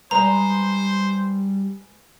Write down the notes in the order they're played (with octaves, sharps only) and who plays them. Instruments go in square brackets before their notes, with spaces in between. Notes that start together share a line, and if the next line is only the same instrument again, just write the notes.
[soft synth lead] G3 [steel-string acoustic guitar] G#3 B4 D#5 [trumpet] C5 [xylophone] A#5